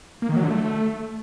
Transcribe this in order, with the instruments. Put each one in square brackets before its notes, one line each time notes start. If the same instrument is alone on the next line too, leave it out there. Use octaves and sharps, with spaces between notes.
[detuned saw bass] A#3
D#3
F#3
D3
A3